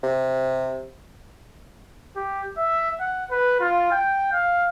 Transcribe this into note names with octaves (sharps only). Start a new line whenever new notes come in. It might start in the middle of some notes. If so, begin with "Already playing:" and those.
C3
G4
E5
F#5
B4
F4
G5
F5